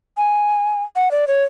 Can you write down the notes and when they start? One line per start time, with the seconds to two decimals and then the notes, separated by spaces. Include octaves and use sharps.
0.17 G#5
0.96 F#5
1.11 D5
1.27 C#5